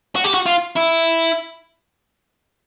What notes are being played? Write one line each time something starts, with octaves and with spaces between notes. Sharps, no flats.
F#4
G4
F#4
F4
E4